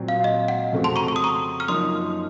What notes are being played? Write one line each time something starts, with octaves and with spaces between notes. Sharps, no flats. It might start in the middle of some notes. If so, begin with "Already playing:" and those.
Already playing: A#2 F#3 C4 F#4
F5
D#5
F#5
F2 C#3 A3 C4 F#4
A5 C6
A#5 C#6
C#6
D#6
A#5 C#6
F6
F#2 F3 A#3 D#4 C6 D#6